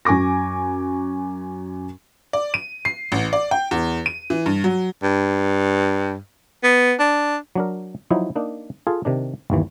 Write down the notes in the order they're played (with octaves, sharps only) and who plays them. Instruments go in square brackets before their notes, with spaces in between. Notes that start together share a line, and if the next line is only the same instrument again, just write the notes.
[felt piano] F#2 G#5 C#6 D6 A#6
[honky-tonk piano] D5
D#7
C7
A1
D5
G5
E2
D#7
E3
G2
F#3
[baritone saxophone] G2
B3
D4
[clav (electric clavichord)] F#3 D4 A#4
F3 F#3 D#4 E4
A#3 D4 D#4
F4 G#4 A4
C3 D#3 D4
G1 D#2 E3